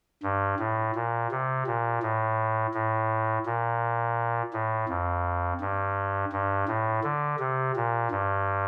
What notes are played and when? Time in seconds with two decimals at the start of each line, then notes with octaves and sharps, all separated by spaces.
0.23 G2
0.59 A2
0.95 A#2
1.31 C3
1.67 A#2
2.02 A2
2.74 A2
3.46 A#2
4.53 A2
4.89 F2
5.61 G2
6.33 G2
6.68 A2
7.04 D3
7.39 C3
7.76 A#2
8.11 G2